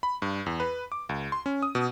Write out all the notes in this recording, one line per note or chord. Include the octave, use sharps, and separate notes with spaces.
B5
G2
E2
B4
D6
C#2
C6
C#4
D#6
B2